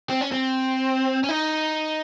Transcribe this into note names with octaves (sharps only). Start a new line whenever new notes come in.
C4
C#4
C4
C#4
D#4